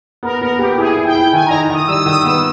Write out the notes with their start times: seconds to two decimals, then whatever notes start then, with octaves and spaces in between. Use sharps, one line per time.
0.23 B3 A#4
0.41 B3 A#4
0.59 B3 G4
0.78 E4 G#4
0.97 E4
1.05 G5
1.15 E4
1.33 D#3 G#5
1.47 D#4 A#5
1.70 D#3 D#6
1.84 D#6
1.88 G3 E6
2.06 D#3 D#6
2.24 B3 E6